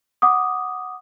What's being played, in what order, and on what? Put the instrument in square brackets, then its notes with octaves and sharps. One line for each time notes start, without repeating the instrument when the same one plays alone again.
[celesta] F#5 D6 D#6